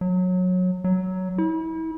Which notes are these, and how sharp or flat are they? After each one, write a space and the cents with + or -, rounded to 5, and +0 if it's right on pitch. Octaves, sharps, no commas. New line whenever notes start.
F#3 -20
F#3 +10
E4 -35